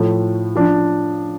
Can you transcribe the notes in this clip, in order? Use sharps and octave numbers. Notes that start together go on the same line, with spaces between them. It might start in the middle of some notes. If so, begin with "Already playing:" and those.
Already playing: A2 F3 A3
F3 D4